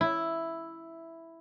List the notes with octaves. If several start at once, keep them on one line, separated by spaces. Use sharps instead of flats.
E4